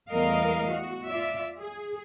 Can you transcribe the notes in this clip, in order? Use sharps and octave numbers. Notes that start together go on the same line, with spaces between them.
E2 G3 A3 A#4 D#5 F5
F#4
F4 D5 E5
G#4